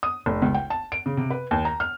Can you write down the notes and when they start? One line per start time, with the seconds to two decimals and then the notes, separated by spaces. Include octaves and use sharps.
0.03 D#6
0.26 F1
0.42 C#2
0.54 G5
0.70 A5
0.92 D7
1.06 C#3
1.17 C3
1.30 B4
1.51 D#2
1.65 A#5
1.80 F6